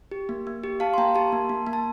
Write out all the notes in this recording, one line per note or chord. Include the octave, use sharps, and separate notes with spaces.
G4
A#3
A#3
G4
G4 F5 A5
C6
A#3 G5 A#5
G4 A5 C6
A#3
A#3
A#3
A5